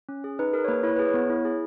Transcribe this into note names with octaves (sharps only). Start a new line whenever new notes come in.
C#4
G#4
D#4 B4
G#4 A#4
C#5
A#3 B4
E4 C#5
G#4 B4
C#5
B3
E4
G#4